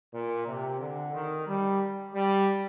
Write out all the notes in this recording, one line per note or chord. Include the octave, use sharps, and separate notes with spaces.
A#2
C3
D3
D#3
G3
G3